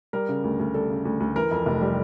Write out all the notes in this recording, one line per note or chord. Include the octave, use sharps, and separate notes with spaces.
G3 A#4
C#3
D2
D2
G3 A4
C#3
D2
D2
E3 A#4
F2
F1
G3